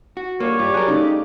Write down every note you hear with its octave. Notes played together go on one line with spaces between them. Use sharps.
F#4
D3 G3 A#3 F4 C#5
G2 F4 G4 D5
F#3 G3 G#4 A#4 F#6
C#3 A3 D#4